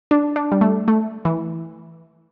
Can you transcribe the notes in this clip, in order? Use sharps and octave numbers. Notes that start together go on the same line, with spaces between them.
D4
D4
G3
A3
A3
E3